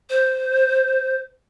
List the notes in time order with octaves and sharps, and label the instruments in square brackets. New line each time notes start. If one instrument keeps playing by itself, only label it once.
[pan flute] C5